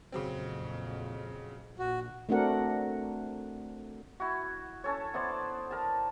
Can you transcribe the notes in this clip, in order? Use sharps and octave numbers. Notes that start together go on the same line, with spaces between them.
A#1 F2 C#3 F#3 C4
A#1 F#4
A3 C4 D4 F#4 A#4 F#5
E4 F#4
C#4 A4 C#5
B3 E4 C5 D5
A#4 A5